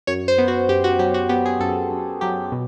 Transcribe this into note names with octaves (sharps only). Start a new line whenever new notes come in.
F#2 C#5
C5
B3
F#4
F#2 G4
F#4
F#3 G4
F#4
B3 G4
G#4
F#2 A4
F#2
F#3 G4
B2